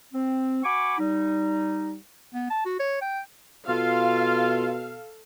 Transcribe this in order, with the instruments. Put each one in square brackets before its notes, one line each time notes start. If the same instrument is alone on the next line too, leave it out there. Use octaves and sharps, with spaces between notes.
[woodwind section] C4
F#4 G#5 B5 C#6 D6
G3 D#4
[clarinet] B3
A5
F#4
C#5
G5
[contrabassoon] B2 [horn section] F4 [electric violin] A4 [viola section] F5